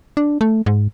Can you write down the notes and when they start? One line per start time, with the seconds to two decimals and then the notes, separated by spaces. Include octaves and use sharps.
0.17 D4
0.41 A3
0.66 G#2